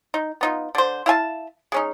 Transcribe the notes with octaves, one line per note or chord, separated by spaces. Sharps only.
D#4
B3 D#4 F4
D3 C5
E4 F5 G#5 A5
G#3 C#4 D#4